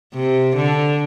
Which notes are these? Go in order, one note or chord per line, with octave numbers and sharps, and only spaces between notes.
C3
D3